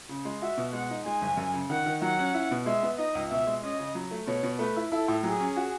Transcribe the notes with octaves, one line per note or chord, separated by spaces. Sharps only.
C#3
G#3
F#4 E5
B2
G#3 F#5
D#4
G#3 G#5
F#1
F#2
C#3
D#3 F#5
D#3
F#3 F#5
C#4
E4
B2
G#3 E5
B3
D#4 D#5
C#2
B2 E5
G#3
C#4 D#5
C#3
F#3
A3
B2 C#5
B2
A3 B4
E4
E4 A4
A2
F#3 G#4
C#4
F#4